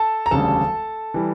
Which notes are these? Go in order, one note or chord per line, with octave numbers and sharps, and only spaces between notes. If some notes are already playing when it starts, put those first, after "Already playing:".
Already playing: A4 A5
A#5
E1 D2 C#3 G3 D4 A4 A5
E3 G3